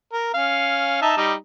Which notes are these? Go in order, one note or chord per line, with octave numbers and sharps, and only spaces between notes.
A#4
C#4 F5
D#4 E5 A5
G3 D#4